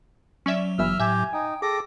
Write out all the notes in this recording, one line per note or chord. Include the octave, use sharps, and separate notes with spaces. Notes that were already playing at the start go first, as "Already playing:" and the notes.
F#3 C#4 D5 E5
G1 E3 E5 E6 F6
A2 F#3 G4 E5 G#5 G6
D#4 G5
G#4 A4 G5 D6 A#6